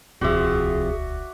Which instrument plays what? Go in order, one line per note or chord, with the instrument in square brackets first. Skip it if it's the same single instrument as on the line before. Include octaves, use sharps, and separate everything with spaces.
[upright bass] D#1 C#2 [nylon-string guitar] C3 F3 [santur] F#4 D5 E5 [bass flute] G#4